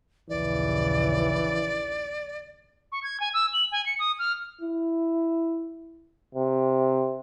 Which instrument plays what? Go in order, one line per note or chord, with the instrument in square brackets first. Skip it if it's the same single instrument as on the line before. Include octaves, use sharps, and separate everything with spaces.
[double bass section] A#1 D#2 C#3 [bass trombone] E3 [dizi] D5
[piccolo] C#6
G#6
G#5
E6
F#7
G#5
C#7
D#6
F6
[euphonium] E4
C3